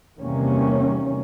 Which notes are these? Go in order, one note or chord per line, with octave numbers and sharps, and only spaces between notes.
E2 C3 D#3 G3 A#3 C#4